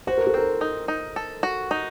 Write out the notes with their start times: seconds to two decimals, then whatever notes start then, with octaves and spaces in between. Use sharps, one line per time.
0.07 F#4 C5
0.17 A#4
0.27 A4
0.34 C4 A#4
0.61 D#4
0.88 D#4
1.16 A4
1.43 F#4
1.71 D#4